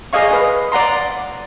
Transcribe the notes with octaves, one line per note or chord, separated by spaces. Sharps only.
G#4 D5 D#5 F5 C#6
B4
D5 F#5 A#5 C6